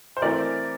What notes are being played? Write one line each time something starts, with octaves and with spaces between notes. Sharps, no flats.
C5
E3 A3 C4 A#4 D5